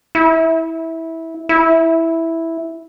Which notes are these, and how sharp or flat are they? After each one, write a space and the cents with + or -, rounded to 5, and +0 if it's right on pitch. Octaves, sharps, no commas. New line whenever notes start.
E4 -15
E4 -5